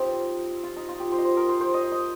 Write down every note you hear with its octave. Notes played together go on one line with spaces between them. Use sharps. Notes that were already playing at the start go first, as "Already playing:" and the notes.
Already playing: C4 D#4 F4 G4
F4
D#4
F4
G4
C5
D#5
C5
A#4
C5
C5
D#5
D#5